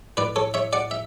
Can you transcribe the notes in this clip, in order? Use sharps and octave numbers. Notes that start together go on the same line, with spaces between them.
A2 B4 D5
A4 C#5
C#5 E5
D5 F#5
E5